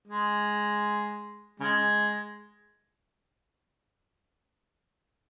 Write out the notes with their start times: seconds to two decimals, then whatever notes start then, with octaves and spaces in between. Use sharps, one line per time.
0.08 G#3
1.60 C#3 G#3